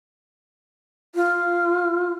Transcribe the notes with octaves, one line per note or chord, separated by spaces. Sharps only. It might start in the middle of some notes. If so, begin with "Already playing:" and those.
F4